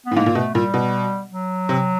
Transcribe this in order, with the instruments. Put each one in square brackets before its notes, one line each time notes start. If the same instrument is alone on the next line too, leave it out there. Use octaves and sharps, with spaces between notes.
[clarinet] B3
[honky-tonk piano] A2
[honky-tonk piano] G#2 [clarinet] A#3
[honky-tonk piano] A#2
[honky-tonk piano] B2 [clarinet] A3
[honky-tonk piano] A#2 [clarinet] G3
[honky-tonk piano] B2
[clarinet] F#3
[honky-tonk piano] C3